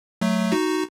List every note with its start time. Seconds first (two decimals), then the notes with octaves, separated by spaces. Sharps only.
0.21 F#3 A3
0.52 D#4 F#4